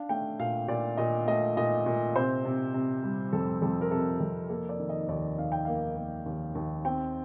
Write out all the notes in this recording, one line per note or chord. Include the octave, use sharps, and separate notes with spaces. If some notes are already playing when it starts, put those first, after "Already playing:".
Already playing: D4 F5
A3 G5
A#2 F5
A#2 D5
A#2 D#5
A3 D#5
A#2 D#5
A#2
C3 C5
C3
C3
G3
F2 A4
F2 A4
A#4
C3 A4
F2 A4
A#3 A4
D5
D#3
D#5
D#2 D5
D#2 F5
G5
A#3 F5
A#3
D#2
D#2
C4 G5